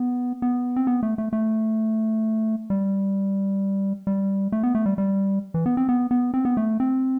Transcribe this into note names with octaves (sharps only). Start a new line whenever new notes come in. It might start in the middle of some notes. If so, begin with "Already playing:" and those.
Already playing: B3
B3
C4
B3
A3
A3
A3
G3
G3
A3
B3
A3
G3
G3
E3
B3
C4
B3
B3
C4
B3
A3
C4